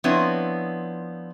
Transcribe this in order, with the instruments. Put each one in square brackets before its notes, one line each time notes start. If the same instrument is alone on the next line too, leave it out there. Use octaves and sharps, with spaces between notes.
[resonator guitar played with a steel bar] F3 B3 C4 D4 E4 C#5